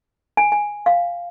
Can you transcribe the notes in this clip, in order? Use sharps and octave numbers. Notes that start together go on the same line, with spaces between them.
G#5
G#5
F5